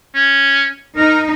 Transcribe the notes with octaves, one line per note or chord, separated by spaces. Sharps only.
C#4
D#4 A#4